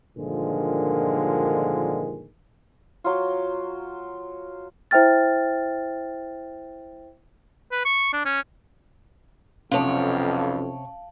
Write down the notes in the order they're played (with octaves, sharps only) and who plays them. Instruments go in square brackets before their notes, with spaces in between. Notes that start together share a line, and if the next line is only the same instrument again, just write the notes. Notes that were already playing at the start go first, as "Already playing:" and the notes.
[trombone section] G2 A#2 D3 D#3 F3 G#3
[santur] F#3 F4
[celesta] E4 C5 E5 G5 F6 A6
[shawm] B4
C#6
D4
C#4
[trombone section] B1 F2 [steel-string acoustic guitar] C3 C#5 [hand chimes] C#4 [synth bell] F5 A5